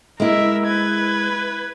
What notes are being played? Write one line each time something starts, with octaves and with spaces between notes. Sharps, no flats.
G#3 E4 A#4 E5
B4 G#6